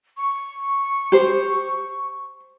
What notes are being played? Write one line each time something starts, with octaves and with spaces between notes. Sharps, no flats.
C#6
G4 C5